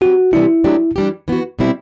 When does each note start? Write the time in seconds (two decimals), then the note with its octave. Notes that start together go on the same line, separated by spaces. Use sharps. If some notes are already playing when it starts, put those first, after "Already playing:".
0.01 F#3 C4 F#4 G4
0.33 C3 E3 G3 D4 E4 G4
0.64 F#3 A3 D4 G4
0.96 E3 G3 D4 G4
1.28 E3 B3 F#4
1.59 B2 G3 C4 E4